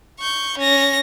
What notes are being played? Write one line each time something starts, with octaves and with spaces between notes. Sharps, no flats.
C#6 G6
C#4 A#6